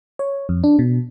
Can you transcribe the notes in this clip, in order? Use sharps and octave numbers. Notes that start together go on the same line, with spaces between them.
C#5
F2
D4
B2